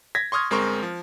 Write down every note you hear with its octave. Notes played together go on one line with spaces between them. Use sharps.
G#6 A#6 B6
C6 C#6 D#6 F6 G#6
G1 G#3 C4 A#4 C6 C#6
F3